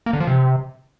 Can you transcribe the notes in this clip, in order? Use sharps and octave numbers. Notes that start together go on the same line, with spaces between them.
A#3
D3
F3
C3